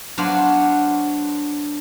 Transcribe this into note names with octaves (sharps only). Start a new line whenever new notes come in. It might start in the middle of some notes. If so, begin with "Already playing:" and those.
F#3 B3 D4 F#4 C5 F5